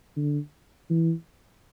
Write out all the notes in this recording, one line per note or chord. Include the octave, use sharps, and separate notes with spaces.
D3
E3